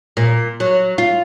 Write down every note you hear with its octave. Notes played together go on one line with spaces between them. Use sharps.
A#2
F#3
F4